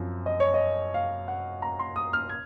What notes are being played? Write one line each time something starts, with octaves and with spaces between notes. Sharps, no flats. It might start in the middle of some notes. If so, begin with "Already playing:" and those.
Already playing: F#2 F3 C4
D#5
C#5
D#5
F5
F#5
A#5
C6
D#6
F6
G#6